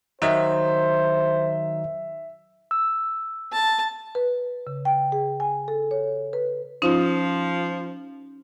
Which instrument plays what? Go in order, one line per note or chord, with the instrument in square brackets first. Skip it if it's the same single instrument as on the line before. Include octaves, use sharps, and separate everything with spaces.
[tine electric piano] D#3 F#3 D#4 [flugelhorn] C5 [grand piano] E5
[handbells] E6
[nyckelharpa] A5
[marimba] B4
C#3
G5
G#4
G#5
A4
C#5
B4
[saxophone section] F3 [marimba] C#4 D#4